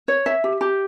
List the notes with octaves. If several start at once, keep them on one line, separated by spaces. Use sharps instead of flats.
C#5
E5
G4
G4